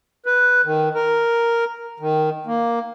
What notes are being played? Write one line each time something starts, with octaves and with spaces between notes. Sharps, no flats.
B4
D#3
A#4
D#3
A#3